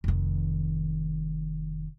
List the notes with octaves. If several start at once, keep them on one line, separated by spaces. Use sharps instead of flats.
F1 D#3